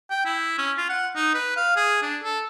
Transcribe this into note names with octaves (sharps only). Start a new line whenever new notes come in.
G5
E4
C#4
F4
F#5
D#4
B4
F5
G#4
D4
A4